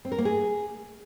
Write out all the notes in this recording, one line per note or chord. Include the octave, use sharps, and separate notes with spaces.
C4
A#4
A#3
G#4